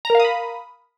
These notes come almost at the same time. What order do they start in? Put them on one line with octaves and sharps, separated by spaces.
A#5 A#4 F5 D#6 B5